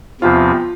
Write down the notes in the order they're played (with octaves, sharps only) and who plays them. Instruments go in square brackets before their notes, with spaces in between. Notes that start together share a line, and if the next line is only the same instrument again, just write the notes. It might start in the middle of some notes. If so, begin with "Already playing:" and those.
[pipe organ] E2 C3 F3 C4 [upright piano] F4